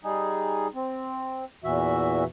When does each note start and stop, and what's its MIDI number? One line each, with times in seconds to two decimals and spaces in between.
0.03 0.67 55
0.03 0.67 63
0.03 0.67 68
0.75 1.44 60
1.64 2.24 40
1.64 2.24 46
1.64 2.24 52
1.64 2.24 66
1.64 2.24 76